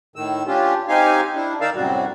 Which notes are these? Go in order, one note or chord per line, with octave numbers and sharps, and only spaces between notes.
A2 D#3 E6
C#4 D4 F4 G4
C4 D#4 G4 F5 G#5
D4 E4
D#3 D#4 A#4 D5 F5 E6
F#2 A2 C3 F#3 G3 F#4